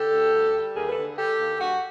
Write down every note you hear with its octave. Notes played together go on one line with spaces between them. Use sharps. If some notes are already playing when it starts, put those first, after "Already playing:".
Already playing: D3 G4 A4
D2
G3
G3
D#2 G#4 A#4
A4 B4
D3
G3 G4 A4
D#2
G2 F#4 G#4